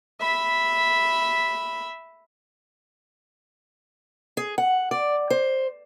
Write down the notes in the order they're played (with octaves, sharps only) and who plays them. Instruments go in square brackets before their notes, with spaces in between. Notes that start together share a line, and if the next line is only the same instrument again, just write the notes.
[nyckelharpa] E5 B5
[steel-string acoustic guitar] G#4
F#5
D5
C5